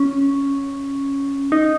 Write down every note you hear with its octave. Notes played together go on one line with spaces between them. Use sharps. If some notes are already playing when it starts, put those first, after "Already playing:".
Already playing: C#4
D#4